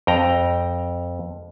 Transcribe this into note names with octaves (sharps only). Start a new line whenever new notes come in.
F2 G5 A#5